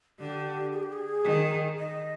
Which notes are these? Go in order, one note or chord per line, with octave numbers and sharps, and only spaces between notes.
D3 G4
G#4
G4
G#4
D#3
D#5